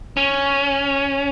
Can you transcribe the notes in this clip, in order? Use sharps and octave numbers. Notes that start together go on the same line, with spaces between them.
C#4